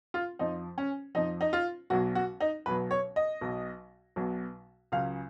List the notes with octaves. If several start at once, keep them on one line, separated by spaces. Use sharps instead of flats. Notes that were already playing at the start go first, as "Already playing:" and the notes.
F4
F2 F3 D#4
C#4
F2 F3 D#4
D#4
F4
B1 B2 F#3 F#4
F#4
D#4
B1 B2 F#3 B4
C#5
D#5
B1 B2 F#3
B1 B2 F#3
C#2 C#3 F#3 F5